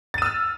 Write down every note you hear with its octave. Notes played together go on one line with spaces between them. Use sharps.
E6 F6 A6 D#7